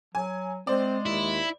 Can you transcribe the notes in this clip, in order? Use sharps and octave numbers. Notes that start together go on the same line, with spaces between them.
F#3 G#5
G#3 C4 C5 D5
D#2 E4